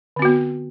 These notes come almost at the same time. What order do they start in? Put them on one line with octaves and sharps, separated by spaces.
D3 C4 F#4 B3